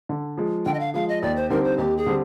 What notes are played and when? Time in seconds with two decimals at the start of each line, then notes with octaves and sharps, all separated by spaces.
0.09 D3
0.37 F3 G#3
0.66 D3 G5
0.74 D#5
0.80 F5
0.94 F3 G#3 F5
1.09 D#5
1.22 D#2 D5
1.36 C5
1.50 D3 G3 C4 D#4 A#4
1.64 C5
1.78 D#2 G4
1.97 G#4
2.06 D3 G3 C4